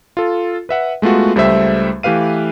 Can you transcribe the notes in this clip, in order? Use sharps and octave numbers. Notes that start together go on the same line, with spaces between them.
F4 A4
B4 E5 F#5
G#3 A3 B3 F4 F#4
C#2 G3 A3 C5 E5
E3 A3 G4 B4 F5 D#7